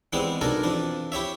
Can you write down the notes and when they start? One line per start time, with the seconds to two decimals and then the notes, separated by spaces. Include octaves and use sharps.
0.13 E3 G3 G#3 B3 C4 E4
0.41 B1 D4 A4 A#4 G#5
0.64 F2 E3 D4
1.12 E4 G4 C#5 E5